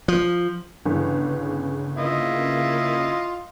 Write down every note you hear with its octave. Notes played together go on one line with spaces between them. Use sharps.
F3
G1 C#3 E3
A#3 E4 F4 D#5